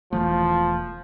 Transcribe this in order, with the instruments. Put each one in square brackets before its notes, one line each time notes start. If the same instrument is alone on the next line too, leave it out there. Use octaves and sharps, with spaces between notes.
[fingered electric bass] E1 E3 A3 [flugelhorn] F3